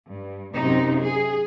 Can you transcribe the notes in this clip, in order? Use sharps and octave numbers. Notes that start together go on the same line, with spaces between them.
G2
F#2 C3 D#4
G#4